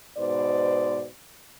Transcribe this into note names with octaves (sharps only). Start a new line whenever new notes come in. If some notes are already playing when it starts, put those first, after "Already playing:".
G#2 B2 B4 C5 D5